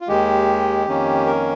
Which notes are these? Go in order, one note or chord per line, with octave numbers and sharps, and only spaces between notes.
F4
D#2 D#3 G#3 G4
F2 D#3 A#3 C#4
A#4